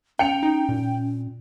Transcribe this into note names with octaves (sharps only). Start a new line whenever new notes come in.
C#4 G5 C#7 F7
D#4
A#2